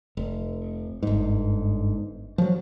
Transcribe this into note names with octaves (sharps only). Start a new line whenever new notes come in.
F1
G1 G#2
F3 F#3